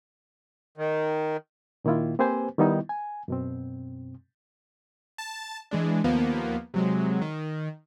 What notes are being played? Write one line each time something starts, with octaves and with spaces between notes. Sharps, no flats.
D#3
A#2 D#3 A#3 E4 F4
A#3 C4 G4 B4 C5 G#5
D#3 G3 B3 D#4 E4
G#5
F#2 B2 C4
A5
E3 G#3 D4
D#2 F3 A#3 B3
C3 F#3 G#3
D#3